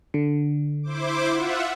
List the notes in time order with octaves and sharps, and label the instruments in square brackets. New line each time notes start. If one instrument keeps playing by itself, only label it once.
[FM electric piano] D3
[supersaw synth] E4 C5 D6
F4 E5 F#5